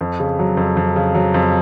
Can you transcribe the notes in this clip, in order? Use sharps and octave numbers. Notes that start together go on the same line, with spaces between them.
F2
C#3
F#3
F2
F2
C#3
F#3
F2